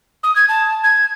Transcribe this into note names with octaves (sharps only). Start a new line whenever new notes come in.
D#6
G#6
A5
G#6